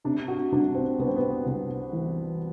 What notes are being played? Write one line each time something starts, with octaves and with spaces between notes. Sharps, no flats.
C3 D4
F#4
C2 D4
C4
C2 B3
C4
B3
C2
E3